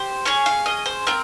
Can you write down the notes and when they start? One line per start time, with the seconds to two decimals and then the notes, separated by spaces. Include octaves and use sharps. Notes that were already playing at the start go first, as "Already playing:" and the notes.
Already playing: G4 C5
0.25 C#4 G#4 C#5
0.46 F5
0.66 D#5
0.86 C5
1.07 C4 F4 A#4